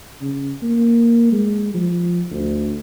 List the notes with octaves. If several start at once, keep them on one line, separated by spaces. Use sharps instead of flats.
C#3
A#3
G#3
F3
D2